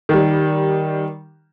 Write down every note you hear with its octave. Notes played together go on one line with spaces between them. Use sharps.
D#3 G3